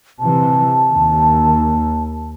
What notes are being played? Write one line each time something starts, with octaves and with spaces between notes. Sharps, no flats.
C3 E3 A5
D#2